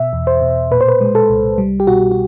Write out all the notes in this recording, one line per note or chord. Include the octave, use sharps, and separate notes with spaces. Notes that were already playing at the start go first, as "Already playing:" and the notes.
Already playing: B2 E5
E2
C5
B2
A#2 B4
C5
B4
G#3
A4
C2
G3
G4
B2 F#4
F#4